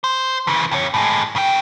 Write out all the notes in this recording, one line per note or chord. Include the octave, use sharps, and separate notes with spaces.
C5
C#3 E3
F2 C#5
A2 G#3
C#3 G5